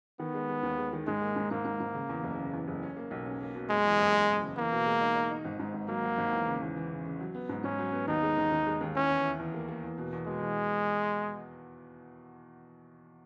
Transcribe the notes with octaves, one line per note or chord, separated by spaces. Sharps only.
D#3 B3
G#3
G#3
D#2
G#3
D#3
G#2 G#3
A#3
G#2
G#2 A#3
G#2
G#2
C#3
E2
F#1
C#3
E2
F#1
C#4
A#3
B1
C#4
A#3
B2
F#1 G#3
E2
F#1
F#1
F#1
C#3
E2 A#3
B2
G#3
D#4
D#4
D#4
G#1
G#2
G#1
F#3 A#3
F#3
G#1
E2
C#3
E2
E3
C#3
C#3
F#3
B3
G#2
G#2 C#4
F#3
B3
D#2 D#4
G#3
D#2
D#2
G#3
D#2
C#4 E4
E2
E4
E2
A#3
A#3
E2
B2
E2
B2 G#3
E2